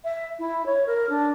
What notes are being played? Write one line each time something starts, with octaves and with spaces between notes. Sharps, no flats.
E5
E4
C#5
A#4
D4